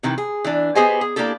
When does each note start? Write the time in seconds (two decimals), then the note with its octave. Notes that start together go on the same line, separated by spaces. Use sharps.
0.03 C3 D#3 E3
0.18 G#4
0.45 E3 D4
0.75 B3 G4 G#4 C5 D#5 G#5
1.01 G#4
1.16 A#3 D4 E4 G4 A4